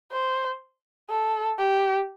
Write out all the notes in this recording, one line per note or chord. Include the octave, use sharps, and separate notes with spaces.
C5
A4
G4